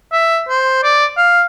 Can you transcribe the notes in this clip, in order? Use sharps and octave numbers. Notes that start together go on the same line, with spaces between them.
E5
C5
D5
F5